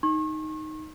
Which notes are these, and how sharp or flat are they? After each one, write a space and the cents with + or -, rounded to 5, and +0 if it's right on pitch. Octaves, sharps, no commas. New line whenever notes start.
D#4 +0 C#6 -40